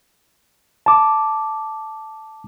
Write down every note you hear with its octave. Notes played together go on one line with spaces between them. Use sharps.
A5 D6